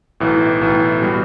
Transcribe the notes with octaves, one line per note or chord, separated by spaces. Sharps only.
B1 A2 E3
B1 A2 E3
B2 G3